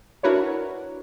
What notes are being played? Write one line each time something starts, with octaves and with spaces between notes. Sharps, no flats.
D4 E4 F#4 A#4 B4 C#5